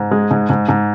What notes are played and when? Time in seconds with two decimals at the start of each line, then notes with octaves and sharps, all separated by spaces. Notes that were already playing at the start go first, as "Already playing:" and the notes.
Already playing: G#2
0.11 G#3
0.31 G#2
0.49 G#2
0.69 G#2